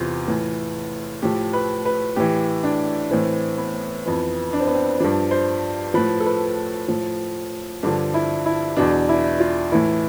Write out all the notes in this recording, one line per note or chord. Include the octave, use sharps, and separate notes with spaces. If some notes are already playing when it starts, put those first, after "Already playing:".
Already playing: E2 C3 E3 F4
A2 E3
A2 F3 G4
B4
B4
A2 E3 G4
D4
A2 E3 C4
B3
F2 E3 B3
D4
C4
B3
C4
G2 F3 D4
C5
A2 F3 B4
A4
B4
A2 F3
G2 D3 F3 D4
E4
E4
E2 B2 D4
E4
F4
A2 E3 E4